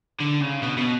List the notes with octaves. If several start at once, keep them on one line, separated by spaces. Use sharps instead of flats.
D3
C#3
B2
B2